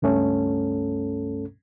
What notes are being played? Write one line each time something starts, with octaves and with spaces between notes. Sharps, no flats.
C#2 G2 A3 C#4 A4